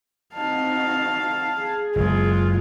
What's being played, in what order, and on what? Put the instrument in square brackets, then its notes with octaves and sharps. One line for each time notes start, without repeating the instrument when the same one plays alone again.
[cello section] C4 D#4 F#4 [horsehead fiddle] F5 A5
[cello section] G#4
[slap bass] F#1 [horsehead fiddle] G#3 F4